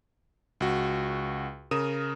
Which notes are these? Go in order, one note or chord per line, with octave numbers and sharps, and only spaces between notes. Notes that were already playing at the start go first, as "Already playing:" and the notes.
C#2 F#4
C#3 A#4 D#6 D#7 E7